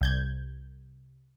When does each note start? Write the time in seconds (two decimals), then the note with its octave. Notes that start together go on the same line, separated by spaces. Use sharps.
0.01 C2 G6 G#6